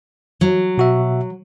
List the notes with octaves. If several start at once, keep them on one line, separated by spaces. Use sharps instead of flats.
F#3
B2 F#4 E5